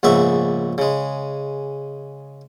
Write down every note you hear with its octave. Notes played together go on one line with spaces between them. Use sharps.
A#1 G#2 C#3 B3 E5 C#6
C#3 G#3